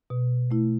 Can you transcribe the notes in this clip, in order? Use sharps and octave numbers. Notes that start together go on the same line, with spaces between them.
B2
A3 E4